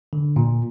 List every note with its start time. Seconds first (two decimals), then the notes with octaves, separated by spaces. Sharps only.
0.13 D3
0.36 A#2